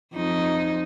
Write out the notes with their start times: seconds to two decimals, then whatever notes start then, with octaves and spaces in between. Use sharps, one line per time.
0.13 F2 D#4